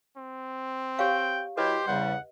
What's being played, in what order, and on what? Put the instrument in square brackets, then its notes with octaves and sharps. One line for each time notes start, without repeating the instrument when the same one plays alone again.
[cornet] C4
[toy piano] G4 C#5 F5 [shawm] G5
[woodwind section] F#3 E4 [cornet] G4 [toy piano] B4 D#5 [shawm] C5
[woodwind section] E2 C#3 G3 [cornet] F#5